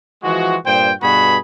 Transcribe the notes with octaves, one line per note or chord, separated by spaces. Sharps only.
E3 F3 G#3 F#4
G2 A#2 C5 G5
G2 B2 F#4 G#4 B5